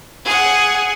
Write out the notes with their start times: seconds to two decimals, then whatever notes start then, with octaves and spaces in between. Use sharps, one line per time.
0.25 G#4 F#5